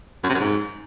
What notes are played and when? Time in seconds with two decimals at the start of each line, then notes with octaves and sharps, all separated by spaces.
0.24 F#2
0.29 C3
0.34 F#2
0.39 G#2